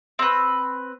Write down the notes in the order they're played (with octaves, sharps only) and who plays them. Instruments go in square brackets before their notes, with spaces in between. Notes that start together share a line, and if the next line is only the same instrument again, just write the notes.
[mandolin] C4 B4